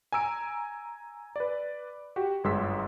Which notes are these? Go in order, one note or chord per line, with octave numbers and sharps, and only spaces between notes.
G#5 A#5 E6 D7
B4 D5
F#4 G4
G1 F#2 G#3 C6 E6 B6